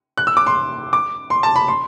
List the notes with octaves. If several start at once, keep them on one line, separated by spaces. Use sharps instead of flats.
F#6
E6
D6
C6
D6
C6
A5
B5
C6